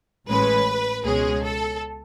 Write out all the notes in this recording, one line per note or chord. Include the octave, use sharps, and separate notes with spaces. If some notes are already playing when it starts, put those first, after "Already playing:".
A1 A2 G#3 C#4 B4
C#2 B2 G#3 C#4 G#4
A4